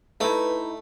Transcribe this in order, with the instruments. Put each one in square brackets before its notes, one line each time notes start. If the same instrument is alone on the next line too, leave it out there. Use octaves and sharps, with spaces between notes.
[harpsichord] A3 [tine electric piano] D#4 E4 [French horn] B4